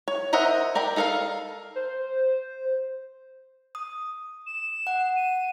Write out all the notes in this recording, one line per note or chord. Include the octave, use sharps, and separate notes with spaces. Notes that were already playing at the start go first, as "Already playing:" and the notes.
C#5
A#4 C5 D#5 E5 F#5
A#4 D5 G5 B5
D#4 A4 A#4 E5 F5
C5
D#6
E7
F#5
D#7